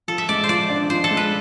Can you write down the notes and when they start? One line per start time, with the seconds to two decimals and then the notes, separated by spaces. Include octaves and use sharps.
0.08 F3 A4
0.18 E5
0.29 G#3 D5
0.44 C5
0.49 F3 D5
0.70 D4
0.90 F3 C5
1.04 A4
1.11 G#3
1.17 B4